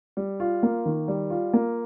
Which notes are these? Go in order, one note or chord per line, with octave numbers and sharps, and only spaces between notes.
G3
F4
A#3
D#3
G3
F4
A#3